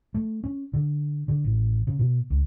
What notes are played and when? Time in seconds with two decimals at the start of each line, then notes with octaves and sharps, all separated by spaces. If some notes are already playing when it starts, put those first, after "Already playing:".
0.14 A3
0.44 C#4
0.73 D3
1.28 D3
1.44 A1
1.87 C#3
1.99 B2
2.30 C#2